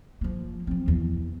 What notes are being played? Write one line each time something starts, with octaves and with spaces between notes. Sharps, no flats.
F3 A#3
F3 C4
E2